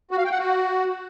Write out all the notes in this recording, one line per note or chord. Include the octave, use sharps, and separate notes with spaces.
F#4
F5
G5
F#5
F#4